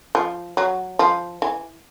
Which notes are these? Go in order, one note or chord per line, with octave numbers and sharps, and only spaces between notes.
F3
F#3
F3
E3